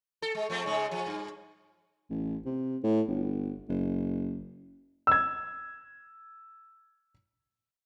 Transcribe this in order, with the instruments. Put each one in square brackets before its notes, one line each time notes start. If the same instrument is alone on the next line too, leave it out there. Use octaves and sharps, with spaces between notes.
[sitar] A4
G#3
F3 A3 C4
G#2 C#3 G#3
F3
G2
[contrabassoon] A1
C3
A2
G1
F#1
[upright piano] E6 G#6